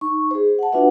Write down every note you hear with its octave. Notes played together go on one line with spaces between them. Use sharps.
D#4 C#6
G#4 C5
F#5 A5
D4 F4 F#4 B4 E5 F#5